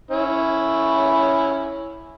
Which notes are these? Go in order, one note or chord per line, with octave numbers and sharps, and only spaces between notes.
C#4 E4 C#5